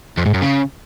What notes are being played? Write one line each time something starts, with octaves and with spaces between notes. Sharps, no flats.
F2
G#2
F#2
C#3